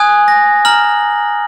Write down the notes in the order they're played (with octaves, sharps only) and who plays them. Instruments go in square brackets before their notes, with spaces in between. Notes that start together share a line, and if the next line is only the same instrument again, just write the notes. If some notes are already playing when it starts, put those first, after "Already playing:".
Already playing: [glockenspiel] G#5 D#6 F#6 G#6
A#6
A#5 F6 F#7